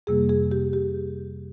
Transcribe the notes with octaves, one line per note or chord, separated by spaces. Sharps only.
F2 C3 G3 A#3 G#4
G#4
G4
G4